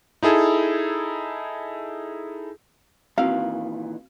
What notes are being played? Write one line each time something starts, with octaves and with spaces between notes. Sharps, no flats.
D#4 E4 G#4 A4
A#2 D#3 E3 C4 F#4 F5